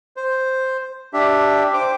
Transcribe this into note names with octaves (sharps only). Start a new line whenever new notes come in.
C5
D4 G4 E5
C5 G5 D6